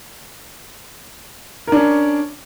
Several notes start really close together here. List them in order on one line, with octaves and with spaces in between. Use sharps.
A#4 D4 C#4